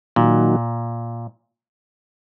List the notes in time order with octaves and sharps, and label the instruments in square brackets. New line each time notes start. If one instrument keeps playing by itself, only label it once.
[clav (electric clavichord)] A#2 [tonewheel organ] D#3 F#3 A#3 D#4 F#4